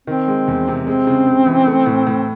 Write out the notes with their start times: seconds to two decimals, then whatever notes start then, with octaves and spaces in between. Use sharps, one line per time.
0.07 D#3 C4
0.28 G#3
0.48 E2
0.68 C3
0.87 G#3 C4
1.07 C#3
1.27 C#3
1.47 E3
1.67 A3
1.86 A2
2.07 A2